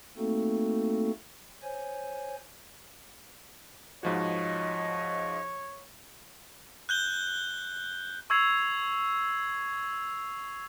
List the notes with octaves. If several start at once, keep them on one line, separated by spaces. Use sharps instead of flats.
A3 A#3 C4 D#4 F#4 A4
C5 C#5 G#5
G#2 F3 F#4 C#5 D#5
F#6 G6 G7
C#6 E6 G#6 C7 F7